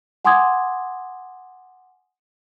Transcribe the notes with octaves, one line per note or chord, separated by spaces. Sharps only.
F#5 G#5 C6 D6 D#6 G#6